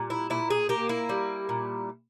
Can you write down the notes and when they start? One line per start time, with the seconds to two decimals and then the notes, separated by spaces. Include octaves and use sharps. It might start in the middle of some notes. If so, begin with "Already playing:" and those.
Already playing: A#2 G3
0.10 E4
0.30 A#2 E4
0.50 G#4
0.69 A#3 G4
0.89 E4
1.09 G3
1.49 A#2